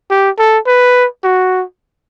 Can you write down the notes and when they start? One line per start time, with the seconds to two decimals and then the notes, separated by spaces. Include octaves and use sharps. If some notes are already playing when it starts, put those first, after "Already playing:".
0.10 G4
0.39 A4
0.67 B4
1.24 F#4